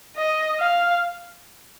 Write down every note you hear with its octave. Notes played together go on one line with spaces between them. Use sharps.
D#5
F5